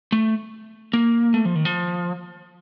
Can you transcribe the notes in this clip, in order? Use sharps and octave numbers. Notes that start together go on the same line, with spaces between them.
A3
A#3
A3
F3
D#3
F3